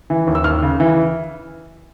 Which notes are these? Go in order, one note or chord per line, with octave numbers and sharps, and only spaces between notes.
E3
D#2
E6
D#2 F6
C#3
E3